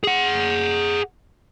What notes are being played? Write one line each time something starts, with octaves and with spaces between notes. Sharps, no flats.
G#4 F#5